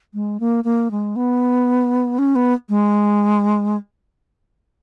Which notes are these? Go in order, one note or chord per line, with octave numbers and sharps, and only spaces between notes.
G#3
A#3
A#3
G#3
B3
C#4
B3
G#3